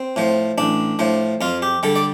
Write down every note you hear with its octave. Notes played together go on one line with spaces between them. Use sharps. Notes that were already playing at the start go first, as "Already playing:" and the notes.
Already playing: C4
A2 F3
A1 D4
A2 F3
F2 F4
G4
D3 G3 A4
D5